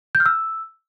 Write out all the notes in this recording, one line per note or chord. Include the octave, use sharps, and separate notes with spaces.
G6
F6
E6